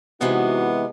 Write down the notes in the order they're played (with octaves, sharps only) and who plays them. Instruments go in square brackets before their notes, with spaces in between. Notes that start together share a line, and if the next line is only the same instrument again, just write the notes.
[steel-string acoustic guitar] C3 E3 G#3 [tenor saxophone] B3 [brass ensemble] D#4 F#4